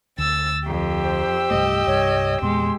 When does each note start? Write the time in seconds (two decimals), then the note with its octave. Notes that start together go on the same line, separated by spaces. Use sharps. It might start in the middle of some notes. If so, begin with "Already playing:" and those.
0.18 D2 E6 A6
0.66 F2 G4 G5 E6
1.03 C5
1.51 C2 G2 A3 D#5
1.87 C2 G2 C#5
2.42 E2 A#2 G#3 B3 C6